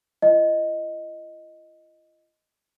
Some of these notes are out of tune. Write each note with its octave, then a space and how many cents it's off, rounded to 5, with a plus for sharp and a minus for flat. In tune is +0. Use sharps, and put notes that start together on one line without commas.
F4 -40 D#5 +0